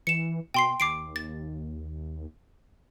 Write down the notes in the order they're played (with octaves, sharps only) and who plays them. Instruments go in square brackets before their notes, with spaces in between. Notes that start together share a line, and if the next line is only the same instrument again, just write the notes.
[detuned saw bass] E3 [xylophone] C#7 E7
[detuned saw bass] B2 [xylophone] G5 C6 C7
[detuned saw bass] D#2 [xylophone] D6 C7 D7
[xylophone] A6